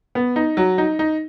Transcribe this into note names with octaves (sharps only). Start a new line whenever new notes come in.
B3
D#4
F#3
D#4
D#4